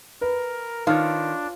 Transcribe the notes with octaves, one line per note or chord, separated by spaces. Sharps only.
A#4 B4
D#3 D4 F4 C#5